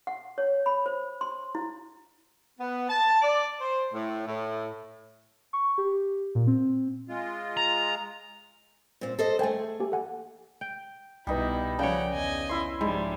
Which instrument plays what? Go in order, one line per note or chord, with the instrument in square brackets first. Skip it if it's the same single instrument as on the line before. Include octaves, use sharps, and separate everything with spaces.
[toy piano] F#5
C#5
B5
C5
C6
E4
[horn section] B3
A5
D5
C5
A2
A2
[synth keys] C#6
G4
A#2
C4
[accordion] G#3 F4
[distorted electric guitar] A#5
[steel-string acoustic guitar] A#2 C4
A4 C5 D#5
[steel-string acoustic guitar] A3 G#4 [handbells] C5 G5 G#5
[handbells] A#3 G4 G#5
A4 F#5 G#5
[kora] G5
[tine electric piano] C2 B4 [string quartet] B2 E4 [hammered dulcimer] G3 D#4
[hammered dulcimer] C#3 [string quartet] F3 F#5 G5 [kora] D4 C#5
[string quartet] E2 D#5 G#5
[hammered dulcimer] E4 C6
[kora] G#2 [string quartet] F3 G3 D4